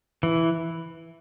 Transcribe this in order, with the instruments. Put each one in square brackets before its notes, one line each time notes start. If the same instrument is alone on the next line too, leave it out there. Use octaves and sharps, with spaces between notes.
[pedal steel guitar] E3